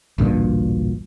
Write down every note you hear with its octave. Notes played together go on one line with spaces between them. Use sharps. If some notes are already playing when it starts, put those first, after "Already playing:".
A1 D2 G2 A#2